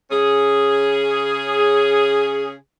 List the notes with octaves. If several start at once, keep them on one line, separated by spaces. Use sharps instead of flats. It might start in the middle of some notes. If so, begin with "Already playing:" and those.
C#3 C#4 G#4